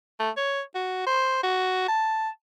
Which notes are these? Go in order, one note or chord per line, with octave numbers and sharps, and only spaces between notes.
A3
C#5
F#4
C5
F#4
A5